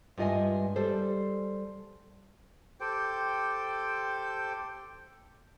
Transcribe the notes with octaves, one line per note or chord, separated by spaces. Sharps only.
G2 G#3 F4 D#5 E5 G#5
G3 A4 C5
G4 A4 C5 G5